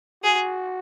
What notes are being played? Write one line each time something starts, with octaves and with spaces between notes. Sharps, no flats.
F#4 G#4